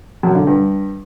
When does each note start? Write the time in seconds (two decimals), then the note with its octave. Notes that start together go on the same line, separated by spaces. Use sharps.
0.23 F#2
0.35 D3
0.47 G2